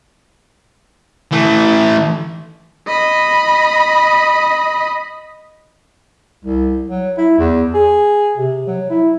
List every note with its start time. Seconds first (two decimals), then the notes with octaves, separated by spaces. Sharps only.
1.32 E3 A3
2.87 D#5 B5
6.44 C2
6.88 F#3
7.17 E4
7.38 E2
7.74 G#4
8.38 C3
8.67 F#3
8.90 E4